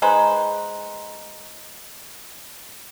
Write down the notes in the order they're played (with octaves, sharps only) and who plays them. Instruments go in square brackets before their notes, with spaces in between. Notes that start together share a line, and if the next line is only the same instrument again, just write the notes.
[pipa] G#3 D#4 B4 C5